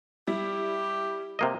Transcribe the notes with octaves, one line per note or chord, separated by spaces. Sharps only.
G3 E4 G4
C3 A#3 D#5